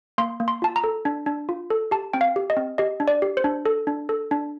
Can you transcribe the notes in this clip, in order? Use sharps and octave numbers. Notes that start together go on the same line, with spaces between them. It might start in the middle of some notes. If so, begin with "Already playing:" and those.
A#3 C6
A#3
C6
F4 A5
A#5
A4
D4
D4
F4
A4
G4 A5
C4 G5
F5
G4
D#5
C4
G4 D#5
D4
D5
G4
C5
D4
A4
D4
A4
D4